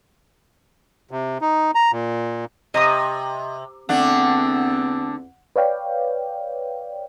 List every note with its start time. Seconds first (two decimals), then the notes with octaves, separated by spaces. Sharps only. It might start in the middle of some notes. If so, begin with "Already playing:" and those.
1.11 C3
1.41 D#4
1.75 A#5
1.92 A#2
2.74 C3 D#5 A#5 D#6
3.89 E2 D3 A3 B3 C4 D4 F#5
5.56 B4 C#5 D5 F5 G5